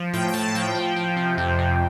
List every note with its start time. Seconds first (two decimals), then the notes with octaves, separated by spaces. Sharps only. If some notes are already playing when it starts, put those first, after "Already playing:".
Already playing: F3
0.13 A2 G5
0.28 G5
0.33 A2 A5
0.55 F3 G5
0.75 F3
0.96 F3
1.16 C3
1.37 F2
1.58 C3